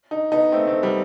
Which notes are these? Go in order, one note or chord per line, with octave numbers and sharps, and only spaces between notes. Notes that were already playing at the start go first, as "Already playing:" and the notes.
D#4
B3 D#4
A3 C4
A3 C4
G3 B3